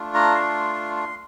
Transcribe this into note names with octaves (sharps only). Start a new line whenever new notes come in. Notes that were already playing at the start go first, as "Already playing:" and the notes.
Already playing: A3 D4 F4
A#5
C6
C6